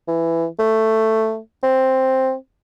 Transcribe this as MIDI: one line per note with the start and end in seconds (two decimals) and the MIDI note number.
0.08 0.46 52
0.59 1.38 57
1.64 2.34 60